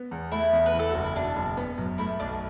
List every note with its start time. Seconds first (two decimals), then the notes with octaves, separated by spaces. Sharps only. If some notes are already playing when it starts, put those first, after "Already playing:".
Already playing: B3
0.11 E2
0.32 A3 E4
0.53 E2
0.66 B4
0.74 E3
0.79 A4
0.91 F#1 F#4
1.03 E4
1.16 B2 D4
1.36 F#1
1.57 B3
1.78 F#2
1.98 A3 E4
2.19 B1 D4